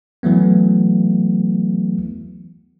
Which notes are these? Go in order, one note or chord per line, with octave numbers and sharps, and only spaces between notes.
E3 F#3 A3 B3